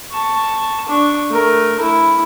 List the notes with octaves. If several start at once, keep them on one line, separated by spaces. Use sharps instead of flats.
A5 C#6
D4 C#6
A3 A#4
E4